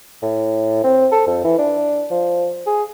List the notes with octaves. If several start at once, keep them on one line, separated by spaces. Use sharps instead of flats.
A2
C4
A4
F2
E3
D4
F3
G#4